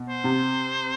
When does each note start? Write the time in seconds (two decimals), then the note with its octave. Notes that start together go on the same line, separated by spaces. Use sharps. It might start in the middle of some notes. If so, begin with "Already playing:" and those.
Already playing: B2
0.09 C5
0.24 C3